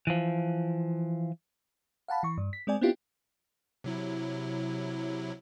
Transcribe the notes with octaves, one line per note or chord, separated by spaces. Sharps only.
E3 F3
F5 F#5 A5 B5
E3 C#6
G2
B6
G#3 C4 D5 G#5
B3 C4 D4 E4 F4 G4
C3 F#3 E4